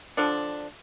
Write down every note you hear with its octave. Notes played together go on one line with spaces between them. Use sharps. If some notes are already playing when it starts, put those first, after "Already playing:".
D3 F3 D4